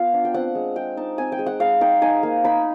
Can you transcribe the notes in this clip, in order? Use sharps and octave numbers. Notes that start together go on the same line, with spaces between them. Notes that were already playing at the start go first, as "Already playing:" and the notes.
Already playing: B3 F4 F5
D4
G5
C4 F#5
G#3
G#3 G5
D#4 A5
C4 G#5
G5
G#3
F#5
G#3 F5
D#4 G5
D#4 G#5
A#3
D#4 B5